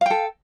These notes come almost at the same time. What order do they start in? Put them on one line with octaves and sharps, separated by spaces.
F5 G5 A4